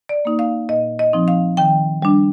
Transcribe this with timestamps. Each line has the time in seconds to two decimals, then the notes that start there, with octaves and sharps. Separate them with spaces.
0.09 D5
0.25 A#3 D#4
0.39 F5
0.69 A#2 D#5
0.99 D#5
1.13 F3 C4 D#4
1.28 F5
1.57 D#3 G5
2.02 G3 D4